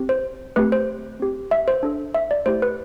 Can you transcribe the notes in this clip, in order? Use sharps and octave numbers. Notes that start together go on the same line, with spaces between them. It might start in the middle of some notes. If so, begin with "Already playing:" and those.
Already playing: C4 G4
C5
A3 C4 G4 B4
C5
C4 G4
E5
C5
D4 A4
E5
D5
A3 E4 G4 C5
B4